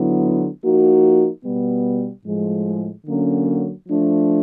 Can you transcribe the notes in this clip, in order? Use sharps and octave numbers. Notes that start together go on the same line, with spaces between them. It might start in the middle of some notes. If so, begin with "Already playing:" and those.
Already playing: D3 F#3 B3 E4
F3 A#3 D#4 F#4
B2 G3 B3
A2 F3 G#3
D3 F#3 A#3 C#4
F3 A3 D4